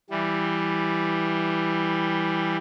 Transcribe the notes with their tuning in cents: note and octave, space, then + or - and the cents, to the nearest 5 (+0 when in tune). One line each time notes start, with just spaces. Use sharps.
E3 +0 G3 +0